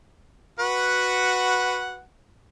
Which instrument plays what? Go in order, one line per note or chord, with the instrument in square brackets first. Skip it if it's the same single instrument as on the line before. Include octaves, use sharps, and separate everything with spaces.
[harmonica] F#4 B4 F#5